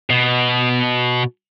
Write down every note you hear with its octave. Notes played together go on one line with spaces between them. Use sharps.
B2